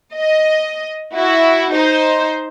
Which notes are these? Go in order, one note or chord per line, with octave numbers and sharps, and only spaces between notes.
D#5
E4 F#4
D#4 C5